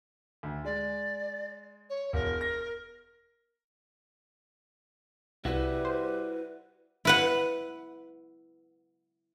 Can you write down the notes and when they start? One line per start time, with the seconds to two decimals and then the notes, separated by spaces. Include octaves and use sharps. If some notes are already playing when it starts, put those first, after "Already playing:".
0.43 D2
0.65 G#3 D5
1.89 C#5
2.13 E1 A#4
2.41 A#6
5.45 C2 G3 E4 F#4 B4 E5
5.85 C5
7.05 E4 B4 F#5